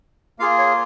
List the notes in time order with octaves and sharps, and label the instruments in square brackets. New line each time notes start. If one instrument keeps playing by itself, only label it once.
[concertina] A#3 F4 G#4 F5
C#5